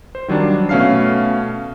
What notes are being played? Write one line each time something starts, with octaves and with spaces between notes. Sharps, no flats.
C5
D#3 F#3 G3 D4 F4
B2 A3 C#4 F5 F6 C7